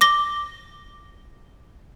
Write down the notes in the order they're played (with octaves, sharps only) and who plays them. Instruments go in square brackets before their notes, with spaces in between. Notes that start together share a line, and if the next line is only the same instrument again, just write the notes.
[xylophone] D6 A#6 G7